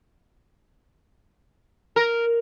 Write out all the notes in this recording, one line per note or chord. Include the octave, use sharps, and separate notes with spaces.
A#4